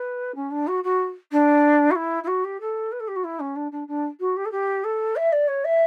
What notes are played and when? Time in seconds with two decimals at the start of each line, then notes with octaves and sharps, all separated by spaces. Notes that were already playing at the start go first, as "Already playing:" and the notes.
Already playing: B4
0.35 C#4
0.51 D4
0.67 F#4
0.84 F#4
1.32 D4
1.91 F#4
1.95 E4
2.23 E4
2.27 F#4
2.44 G4
2.60 A4
2.92 B4
3.00 A4
3.08 G4
3.16 F#4
3.24 E4
3.40 C#4
3.56 D4
3.72 D4
3.88 D4
4.20 F#4
4.36 G4
4.45 A4
4.51 G4
4.84 A4
5.16 E5
5.32 D5
5.48 C#5
5.64 E5